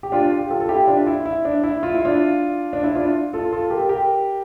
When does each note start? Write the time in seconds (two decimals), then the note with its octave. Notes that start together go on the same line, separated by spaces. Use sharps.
0.03 G4
0.12 D4 F4
0.39 G4
0.50 F4 A4
0.60 A4
0.69 E4 G4
0.88 D4 F4
1.07 E4
1.26 E4
1.45 D4
1.64 E4
1.83 F4
1.94 E4
2.05 D4 F4
2.73 D4
2.84 E4
2.95 D4 F4
3.33 F4 A4
3.52 F4 A4
3.70 G4 A#4
3.89 G4 A#4